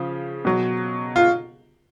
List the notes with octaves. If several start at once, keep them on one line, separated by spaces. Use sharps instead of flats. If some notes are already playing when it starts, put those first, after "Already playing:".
Already playing: C#3 F3
B2 F#3
F4